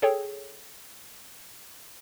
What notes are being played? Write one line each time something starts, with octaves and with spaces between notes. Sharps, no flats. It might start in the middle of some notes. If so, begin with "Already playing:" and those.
G#4 A4 C#5 G5